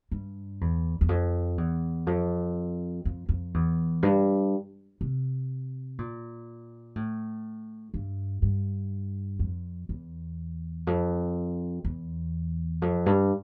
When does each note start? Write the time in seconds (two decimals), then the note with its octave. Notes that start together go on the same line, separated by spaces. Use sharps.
0.11 G2
0.61 E2
1.01 E2
1.09 F2
1.58 E2
2.07 F2
3.05 F2
3.29 F2
3.54 E2
4.03 G2
5.01 C3
5.99 A#2
6.96 A2
7.94 G2
8.42 G2
9.39 F2
9.89 E2
10.87 F2
11.85 E2
12.82 F2
13.06 G2